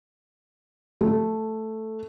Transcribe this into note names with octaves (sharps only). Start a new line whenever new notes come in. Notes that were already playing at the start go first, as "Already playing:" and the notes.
A3